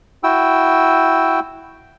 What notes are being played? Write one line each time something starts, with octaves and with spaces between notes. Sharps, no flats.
E4 F#4 G5 E6